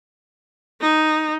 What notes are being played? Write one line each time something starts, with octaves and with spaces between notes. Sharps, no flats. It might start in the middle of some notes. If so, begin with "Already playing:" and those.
D#4